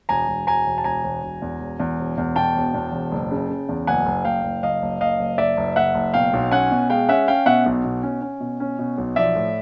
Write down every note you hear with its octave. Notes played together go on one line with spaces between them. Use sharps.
E1 G#5 A#5
E1
E1 G#5 A#5
E1
A5
E1 G#5 A#5
E1
E1
E2
E1
E2
E1
E2
B2 G5 A5
E1
E2
E1
F#1
C#3
C#3
E2
F#1 F#5 G#5
F#1
F#1 F5 G5
F#1
F#1 D#5 F5
F#1
F#1 D#5 F5
F#1
F#1 D5 E5
F#1
F#1 E5 F#5
F#1
B2 F5 G5
B1
C#4 F#5 G#5
B2
G#3 F5 G5
C#4 E5 F#5
C#4 F5 G5
B2 E5 F#5
B1
B2
C#4
C#4
B2
C#4
B2
B1
F3 D5 E5
A2